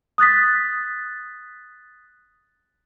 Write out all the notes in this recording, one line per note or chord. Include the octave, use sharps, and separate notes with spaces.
D#6 F#6 A6 B6